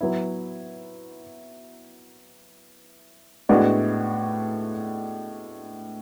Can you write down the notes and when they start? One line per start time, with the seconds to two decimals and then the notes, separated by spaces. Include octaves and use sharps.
0.01 F#3 B3 E4
3.49 A2 G#3 B3 D4 F#4